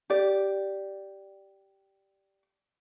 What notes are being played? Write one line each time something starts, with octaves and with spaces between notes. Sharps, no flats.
G4 D5